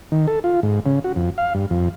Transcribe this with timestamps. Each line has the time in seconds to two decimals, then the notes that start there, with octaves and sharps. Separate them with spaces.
0.12 D#3
0.27 A4
0.44 F4
0.63 G#2
0.86 C#3
1.04 F#4
1.16 F2
1.38 F5
1.54 G2
1.70 F2